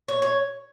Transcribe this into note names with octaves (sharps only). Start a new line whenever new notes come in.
C#5
C#5